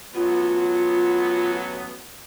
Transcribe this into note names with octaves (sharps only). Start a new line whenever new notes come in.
A1 F#3 B3 F4